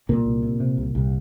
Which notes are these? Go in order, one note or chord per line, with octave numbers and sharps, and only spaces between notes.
C2 A#2 A#3
C2
C3
C3
C2
C2